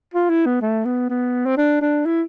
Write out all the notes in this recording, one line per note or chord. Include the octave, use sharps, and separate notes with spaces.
F4
E4
B3
A3
B3
B3
C4
D4
D4
E4